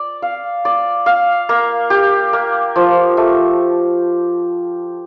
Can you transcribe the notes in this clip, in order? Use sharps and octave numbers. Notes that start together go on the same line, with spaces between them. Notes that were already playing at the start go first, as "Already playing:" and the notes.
Already playing: D5
F5
D5
F5
A#3
G4
A#3
F3
A3